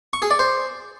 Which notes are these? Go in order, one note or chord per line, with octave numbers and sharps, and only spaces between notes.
C#6
G#4
D5
C5